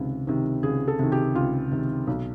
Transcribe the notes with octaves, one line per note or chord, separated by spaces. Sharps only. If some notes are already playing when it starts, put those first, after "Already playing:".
Already playing: C#2 C3 D#3
C3 D#3
C#2 G#4
A4
C3 D#3
G4
C#2 F4
C3 D#3
B1